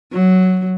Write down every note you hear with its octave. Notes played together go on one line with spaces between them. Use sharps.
F#3